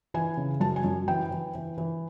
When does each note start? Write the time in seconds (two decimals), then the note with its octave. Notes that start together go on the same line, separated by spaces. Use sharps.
0.14 E3 G#5
0.37 C#3
0.60 F#2 A5
0.76 G#5
0.84 F#2
1.08 E3 G5
1.31 E3
1.55 E3
1.78 E3